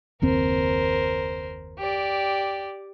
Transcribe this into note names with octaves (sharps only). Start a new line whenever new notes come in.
F#1 D#2 C4 A#4 C5
G4 D5